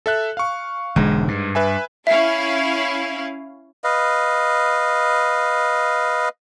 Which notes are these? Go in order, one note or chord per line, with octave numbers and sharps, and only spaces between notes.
A4 E5 F#6
F5 C#6
E1 G#2 D3 G#3
G2
B4 E5 G#5
C#4 E4 E5 F5
B4 D#5 F5